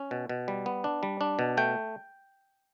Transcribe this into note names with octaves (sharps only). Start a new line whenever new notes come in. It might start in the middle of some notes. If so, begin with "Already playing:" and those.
Already playing: C#4
B2
B2
G3
B3
D4
G3
D4
B2
A3 G5